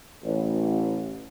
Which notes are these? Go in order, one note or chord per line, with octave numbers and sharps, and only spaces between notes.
A1